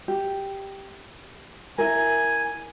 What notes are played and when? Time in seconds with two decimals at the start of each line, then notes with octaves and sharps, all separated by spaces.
0.08 G4
1.78 E4 A#4 G#5